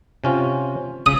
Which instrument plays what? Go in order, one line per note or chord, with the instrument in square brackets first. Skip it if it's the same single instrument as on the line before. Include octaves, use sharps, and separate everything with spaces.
[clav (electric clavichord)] C3 C#4 F4
[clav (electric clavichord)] C#3 [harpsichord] D#6